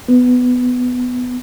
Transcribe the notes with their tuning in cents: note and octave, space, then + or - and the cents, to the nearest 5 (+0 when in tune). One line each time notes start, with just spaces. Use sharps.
B3 +10